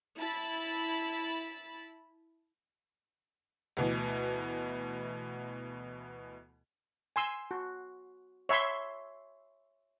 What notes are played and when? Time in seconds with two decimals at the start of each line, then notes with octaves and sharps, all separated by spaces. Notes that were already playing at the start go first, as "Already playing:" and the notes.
0.18 E4 A5 B5 A6
3.77 D2 B2 E3
7.16 G#5 C6 E6
7.51 F#4
8.49 C#5 E5 B5 C6